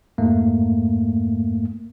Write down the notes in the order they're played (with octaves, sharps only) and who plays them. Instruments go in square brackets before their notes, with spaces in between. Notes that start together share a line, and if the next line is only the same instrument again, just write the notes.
[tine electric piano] F2 G#2 A3 A#3